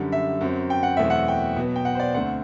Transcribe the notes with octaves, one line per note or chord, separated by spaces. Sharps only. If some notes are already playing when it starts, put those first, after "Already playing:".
Already playing: F#2 D3 G3
E5
F#2 F#3 C4
G5
F#5
E2 B2 F#3 A3 C4 E5
F#5
G5
B2 F#3 B3
G5
F#5
C5
D5
D2 D3 A3 C4 F#5